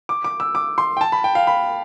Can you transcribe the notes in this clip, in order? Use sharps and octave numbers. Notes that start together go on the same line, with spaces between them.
D6
D6
E6
D6
C6
G5
A5
B5
G5
F5
B5